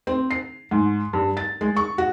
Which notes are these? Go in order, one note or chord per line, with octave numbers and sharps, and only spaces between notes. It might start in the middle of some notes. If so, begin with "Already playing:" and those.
C4
C7
G#2
G2
A6
G#3
C#6
F#4